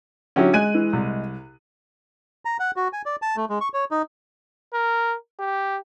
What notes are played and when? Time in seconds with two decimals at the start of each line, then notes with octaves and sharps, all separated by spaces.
0.36 D3 F#3 C#4 E4 G4
0.54 G#3 G#5 F#6 D#7
0.75 E3
0.93 C2
2.45 A#5
2.60 F#5
2.76 F#4
2.93 G#5
3.06 D5
3.22 A5
3.36 A3
3.50 G#3
3.61 C#6
3.74 C#5
3.91 D#4
4.74 A#4
5.40 G4